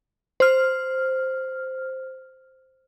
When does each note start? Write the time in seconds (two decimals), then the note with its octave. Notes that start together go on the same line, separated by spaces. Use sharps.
0.40 C5 F6